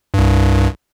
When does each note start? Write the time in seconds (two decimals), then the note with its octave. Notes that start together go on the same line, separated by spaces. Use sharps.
0.14 C2 G2